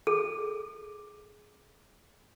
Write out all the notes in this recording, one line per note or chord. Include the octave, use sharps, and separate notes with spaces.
G#4 A4